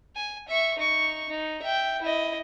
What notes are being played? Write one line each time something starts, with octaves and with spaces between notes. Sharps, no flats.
G#5
E5 C#6
D#4 C#6
D#4
E5 G5
E4 D#5